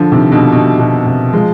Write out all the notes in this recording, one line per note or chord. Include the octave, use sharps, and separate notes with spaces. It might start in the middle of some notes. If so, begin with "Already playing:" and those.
Already playing: D3 F3
C3 D#3
B2 D3
B2
B2
C3
F3 G#3